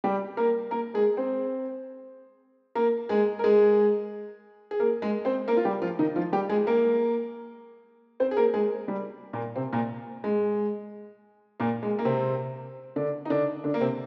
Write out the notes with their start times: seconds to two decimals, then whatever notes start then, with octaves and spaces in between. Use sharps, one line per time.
0.04 G3 G4
0.37 A#3 A#4
0.71 A#3 A#4
0.94 G#3 G#4
1.17 C4 C5
2.75 A#3 A#4
3.09 G#3 G#4
3.39 A#4
3.44 G#3 G#4
4.71 G#4
4.80 A#3 A#4
5.02 G#3 G#4
5.25 C4 C5
5.48 A#3 A#4
5.57 F4
5.65 G3 G4
5.82 F3 F4
5.99 D#3 D#4
6.16 F3 F4
6.33 G3 G4
6.49 G#3 G#4
6.67 A#3 A#4
8.20 C4 C5
8.31 G#4
8.37 A#3 A#4
8.54 G#3 G#4
8.88 G3
9.33 A#2 A#3
9.56 C3 C4
9.73 A#2 A#3
10.24 G#3
11.60 A#2 A#3
11.83 G#3
11.99 A#3
12.05 C3 C4
12.96 D3 D4
13.25 D#4
13.30 D3 D4
13.64 D3 D4
13.74 A#3
13.81 C3 C4